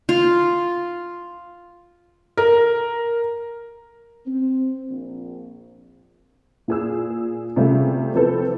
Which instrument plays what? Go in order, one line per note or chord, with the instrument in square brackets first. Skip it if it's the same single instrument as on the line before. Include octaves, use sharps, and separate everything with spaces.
[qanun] F4
[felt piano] A#4
[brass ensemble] C4
A#1
[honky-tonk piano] A#2 G#4 E6
C3 G3 A3 C#4 F4 G#4
E3 F3 B3 C4 A4 B4